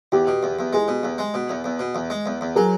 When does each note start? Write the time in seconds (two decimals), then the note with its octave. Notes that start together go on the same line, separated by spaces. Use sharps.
0.12 E2 G4
0.27 B2
0.43 E2
0.59 E2
0.73 G#3 G#4
0.88 B2
1.03 E2
1.18 G#3
1.34 B2
1.49 E2
1.64 E2
1.79 B2
1.95 E2
2.10 G#3
2.26 E2
2.41 E2
2.55 F#3 G#4 A#4